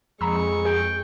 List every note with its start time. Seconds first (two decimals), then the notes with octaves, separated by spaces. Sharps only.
0.21 F2 G#3 A#5 B5 C#6 E6
0.65 G#4 G5